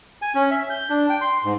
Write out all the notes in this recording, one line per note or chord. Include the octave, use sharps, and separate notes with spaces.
G#5
C#4
E5
G6
D4
G5
C6
G#2